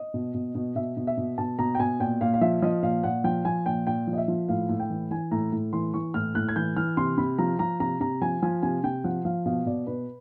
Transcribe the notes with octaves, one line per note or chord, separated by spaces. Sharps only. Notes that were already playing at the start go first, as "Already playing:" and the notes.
Already playing: D#5
B2
B2
B2
B2 E5
B2
E5
B2
B2 A5
B2 A#5
G5
B2 G#5
A#2 G5
A#2 F5
F5
F3 E5
F3 D#5
A#2 F5
A#2 F#5
F3 G5
F3 G#5
A#2 G5
A#2 G5
F3
D#5
E5
F3
A2 F5
A2
G5
E3
E3 G#5
A2 A#5
A2
E3 C6
E3 C#6
A2 F6
A2 F#6
G#6
E3 G6
E3 F6
C3 C6
C3 B5
F3 A#5
F3 A#5
C3 A#5
C3 A#5
F3 G#5
F3 G#5
C3 G#5
C3 G5
F3 F#5
F3 F5
B2 F5
B2 D5
B2 B4